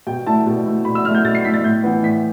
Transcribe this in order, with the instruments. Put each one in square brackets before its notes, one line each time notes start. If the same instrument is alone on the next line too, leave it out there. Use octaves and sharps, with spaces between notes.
[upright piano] B2 G5
A3 E4 A5
B2
A3 E4
B2 B5
E6
A3 E4 F6
G6
B2 A6
C7
A3 E4 B6
A6
A2 G6
E3 B3
A2 B6